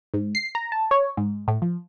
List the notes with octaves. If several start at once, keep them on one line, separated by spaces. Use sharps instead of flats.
G#2
C7
A#5
A5
C#5
G#2
A2
F3